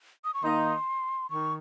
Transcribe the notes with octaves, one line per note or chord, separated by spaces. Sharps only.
D#6
C#6
D#3 A#3 D#4 C6
D#3 C#6